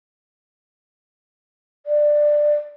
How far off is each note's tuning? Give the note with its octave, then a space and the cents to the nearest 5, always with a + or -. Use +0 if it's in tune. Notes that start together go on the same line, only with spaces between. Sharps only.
D5 +15